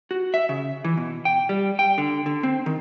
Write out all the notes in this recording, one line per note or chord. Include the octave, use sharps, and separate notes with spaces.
F#4
E5
C#3
E3
B2
G5
G3
G5
D3
D3
C4
D#3